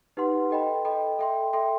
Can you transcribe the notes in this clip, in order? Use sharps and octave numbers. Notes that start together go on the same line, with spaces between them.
D#4 G4 B4 F#5 C6
A4 D#5 G5 B5
A4 D#5 G5 B5
A4 E5 G5 C6
A4 E5 G5 C6